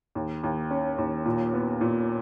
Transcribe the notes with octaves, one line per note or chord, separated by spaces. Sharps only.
D#2
D#2
C#4
D#2
A#2
B3
A#2